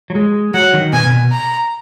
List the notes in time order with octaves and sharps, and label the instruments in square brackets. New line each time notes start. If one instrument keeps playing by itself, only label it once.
[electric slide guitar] F#3
G#3
[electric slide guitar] F#3 [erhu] F#5
[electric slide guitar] D#3
[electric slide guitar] B2 [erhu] G#5
[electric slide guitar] B2
[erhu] A#5